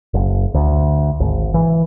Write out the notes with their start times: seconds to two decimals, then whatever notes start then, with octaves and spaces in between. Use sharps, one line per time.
0.14 F#1
0.54 D2
1.20 G#1
1.54 E3